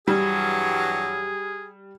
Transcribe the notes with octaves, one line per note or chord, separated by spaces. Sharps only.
G2 E3 F#3 G3 G#4